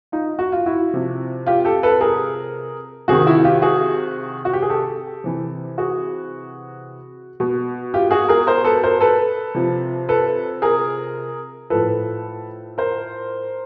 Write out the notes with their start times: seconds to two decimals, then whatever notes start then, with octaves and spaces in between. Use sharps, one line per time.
0.12 D#4 F4
0.39 F#4
0.52 F4
0.66 E4 F#4
0.94 C3 F3
1.46 F4 G4
1.65 G4 A4
1.83 A4 B4
2.01 G#4 A#4
3.08 C3 D#3 F#4 G#4
3.26 E4 F#4
3.44 F4 G4
3.62 F#4 G#4
4.45 F#4
4.53 G4
4.62 G#4
4.70 G4 A4
5.24 C3 E3
5.78 F#4 G#4
7.40 B2
7.94 F4 G4
8.11 F#4 G#4
8.29 G#4 A#4
8.47 A#4 C5
8.65 A4 B4
8.83 A#4 C5
9.01 A4 B4
9.55 C3 F3
10.09 A4 B4
10.62 G#4 A#4
11.70 A2 F3 A4 B4
12.78 A#4 C5